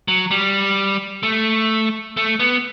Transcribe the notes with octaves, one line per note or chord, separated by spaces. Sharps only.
F#3
G3
A3
A3
B3